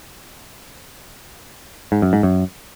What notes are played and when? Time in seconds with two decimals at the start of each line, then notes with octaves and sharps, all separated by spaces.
1.92 G#2
2.02 F#2
2.13 G#2
2.23 F#2